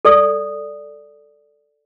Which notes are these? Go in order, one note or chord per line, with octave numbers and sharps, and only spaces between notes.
A4 D5 D#6